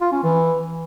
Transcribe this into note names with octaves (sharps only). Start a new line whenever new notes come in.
F4
C#4
E3